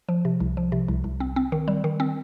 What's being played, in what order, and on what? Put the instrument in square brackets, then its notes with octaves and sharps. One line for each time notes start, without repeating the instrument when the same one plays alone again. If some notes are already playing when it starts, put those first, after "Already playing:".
[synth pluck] F3
C3
C2
F3
C3
C2
C2
C4
C4
D#3
G3
D#3
C4